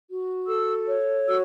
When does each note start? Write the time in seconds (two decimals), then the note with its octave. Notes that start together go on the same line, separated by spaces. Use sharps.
0.09 F#4
0.48 A4 E6
0.88 C#5
1.27 F#4 E6